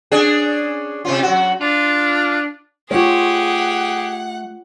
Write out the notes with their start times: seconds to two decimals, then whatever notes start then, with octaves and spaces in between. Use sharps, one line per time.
0.12 C#4 D4 G#4
1.05 C3 C#4 F4
1.23 F#3 F#4
1.61 D4 F4
2.91 A3 F4 G4 G#4 C#5 F#5